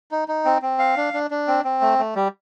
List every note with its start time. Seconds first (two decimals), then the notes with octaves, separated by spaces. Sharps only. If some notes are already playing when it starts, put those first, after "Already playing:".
0.11 D#4
0.28 D#4
0.45 C4
0.62 C4
0.79 F5
0.97 D4
1.13 D4
1.31 D4
1.48 C4
1.64 C4
1.81 A3
1.99 A3
2.15 G3